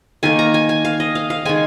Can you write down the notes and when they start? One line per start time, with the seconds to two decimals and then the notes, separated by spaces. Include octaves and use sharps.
0.23 D#3 A#3 G#5
0.39 A#5
0.54 G#5
0.69 G#5
0.85 F5
1.00 D#5
1.15 F5
1.30 F5
1.45 D#3 G#3 G#5